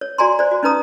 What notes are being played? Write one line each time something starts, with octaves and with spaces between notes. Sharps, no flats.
C#5
F#4 D5 G#5 A#5 C6
C5 D5
F#4
C#4 D#4 B4 A#5 D#6